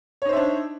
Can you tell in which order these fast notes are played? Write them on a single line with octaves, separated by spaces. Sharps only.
C#5 D#4 C5 E5 D4